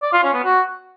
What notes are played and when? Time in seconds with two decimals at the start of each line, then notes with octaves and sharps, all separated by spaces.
0.02 D5
0.13 F4
0.23 C#4
0.34 B3
0.44 F#4